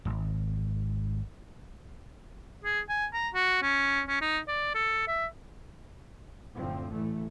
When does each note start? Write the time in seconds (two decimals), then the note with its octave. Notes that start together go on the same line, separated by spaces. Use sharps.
0.05 D1 G#1
2.64 G#4
2.89 G#5
3.14 A#5
3.34 F#4
3.62 C#4
4.08 C#4
4.21 D#4
4.48 D5
4.75 A4
5.08 E5
6.55 F#2 A2 D3 F3 C4
6.92 A1 E3 A3